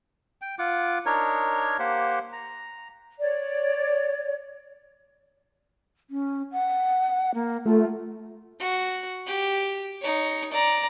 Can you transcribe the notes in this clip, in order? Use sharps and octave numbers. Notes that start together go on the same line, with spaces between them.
G5
F4 F#5 D6
D4 D#4 A#4 C#5
A#3 G4 C5 F#5
A#5
C#5 D5
C#4
F#5
A#3
A3 F4
F#4
G4
D#4 C#5
D5 A#5